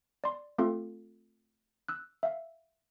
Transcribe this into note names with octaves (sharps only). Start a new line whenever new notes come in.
D5 C6
A3 C4 F4 A4 F5
E6 F#6
E5 F5